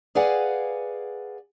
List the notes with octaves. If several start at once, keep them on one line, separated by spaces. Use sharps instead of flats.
G#4 B4 D5 F5 F#5 G#5